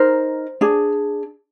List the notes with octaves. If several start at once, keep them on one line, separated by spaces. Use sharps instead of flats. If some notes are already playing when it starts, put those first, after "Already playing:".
Already playing: D#4 A#4 C5
D4 G#4